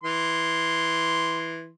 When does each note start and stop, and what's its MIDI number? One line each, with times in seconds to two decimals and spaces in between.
0.04 1.70 52
0.04 1.70 84